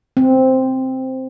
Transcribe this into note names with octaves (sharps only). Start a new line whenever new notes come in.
C4